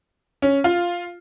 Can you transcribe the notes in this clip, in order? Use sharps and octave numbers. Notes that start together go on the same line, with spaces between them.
C#4
F4